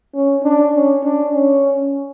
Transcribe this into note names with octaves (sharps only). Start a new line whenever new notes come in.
C#4
D4
C#4
D4
C#4